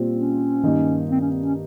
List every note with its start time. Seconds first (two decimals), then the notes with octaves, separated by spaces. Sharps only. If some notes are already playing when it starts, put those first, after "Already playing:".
Already playing: A#2 G3 C4 F4
0.15 C#4
0.63 G2 D#3 A#3 D#4
1.11 C4
1.21 C#4
1.31 C4
1.43 C#4